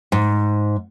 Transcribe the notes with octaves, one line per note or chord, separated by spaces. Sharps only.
G#2